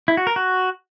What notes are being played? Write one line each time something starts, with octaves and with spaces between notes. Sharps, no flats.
E4
F#4
A#4
F#4